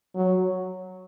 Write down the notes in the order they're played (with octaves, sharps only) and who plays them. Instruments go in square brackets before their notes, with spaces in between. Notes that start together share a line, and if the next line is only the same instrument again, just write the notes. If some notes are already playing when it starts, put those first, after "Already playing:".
[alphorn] F#3